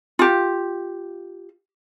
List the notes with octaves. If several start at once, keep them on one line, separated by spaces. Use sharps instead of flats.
F4 G4